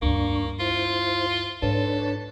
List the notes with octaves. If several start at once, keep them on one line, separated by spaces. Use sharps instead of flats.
D2 G2 A#3 D4 C#6
E4 F4 C5
G#2 D4 A4 B4 C#5